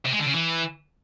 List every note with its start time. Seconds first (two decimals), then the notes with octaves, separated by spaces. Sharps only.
0.06 C3
0.13 G#3
0.20 D3
0.26 C#3
0.33 E3